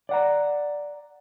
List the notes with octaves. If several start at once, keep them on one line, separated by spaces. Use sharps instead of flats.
D5 F#5 A#5